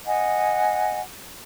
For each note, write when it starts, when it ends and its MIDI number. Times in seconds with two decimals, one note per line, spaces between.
0.07 0.99 75
0.07 0.99 78
0.07 0.99 80